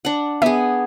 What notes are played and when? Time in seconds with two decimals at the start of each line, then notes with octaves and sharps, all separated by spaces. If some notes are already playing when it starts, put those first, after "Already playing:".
0.05 D4 F#5
0.42 B3 G#4 E5